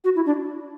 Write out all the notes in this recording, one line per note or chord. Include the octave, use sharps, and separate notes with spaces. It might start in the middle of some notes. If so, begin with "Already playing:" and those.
F#4
E4
D4